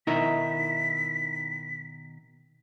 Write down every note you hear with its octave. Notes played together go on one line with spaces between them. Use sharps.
B2 D#3 D#4 E4 A#4 B6